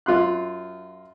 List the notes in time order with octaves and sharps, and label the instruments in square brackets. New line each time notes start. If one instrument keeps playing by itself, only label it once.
[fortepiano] F#2 F4 C6 F#6